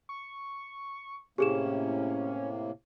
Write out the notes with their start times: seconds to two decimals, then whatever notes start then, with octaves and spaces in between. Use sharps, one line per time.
0.09 C#6
1.38 A2 C3 A#3 C#4 G4 G#4 E7